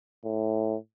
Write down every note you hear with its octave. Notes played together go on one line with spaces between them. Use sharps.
A2